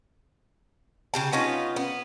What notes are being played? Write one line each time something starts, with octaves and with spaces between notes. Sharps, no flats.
C#3 G4 A5
B3 C#4 D#4 F4
B3